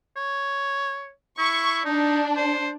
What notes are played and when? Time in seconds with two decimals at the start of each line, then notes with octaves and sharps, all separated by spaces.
0.16 C#5
1.39 E4 C#6
1.85 D4 D#4
2.36 C5